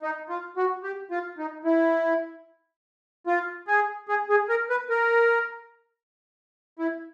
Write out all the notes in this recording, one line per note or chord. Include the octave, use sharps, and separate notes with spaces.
D#4
F4
F#4
G4
F4
D#4
E4
F4
G#4
G#4
G#4
A#4
B4
A#4
E4